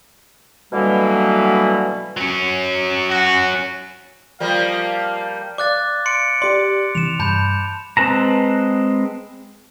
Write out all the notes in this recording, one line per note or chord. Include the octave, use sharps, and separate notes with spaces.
B2 D3 E3 F#3 G3 A#3
F#3 C#4
F#4
F3 G3 A#3 F5
D5 F5 D6 F#6 A6
C6 C#7 D7
G4 D5 C6
C3 E3 E7 F7
G2 A5 B5 G6
G#3 C4 B4 A5 A#5